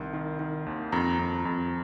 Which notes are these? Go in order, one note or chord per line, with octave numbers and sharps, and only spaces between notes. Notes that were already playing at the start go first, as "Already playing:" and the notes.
Already playing: C2 D#3
D#3
D#3
D#2
F2 A#5
F2
F2